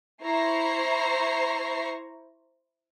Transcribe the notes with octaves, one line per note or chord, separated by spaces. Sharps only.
E4 C5 A#5 C#6 C7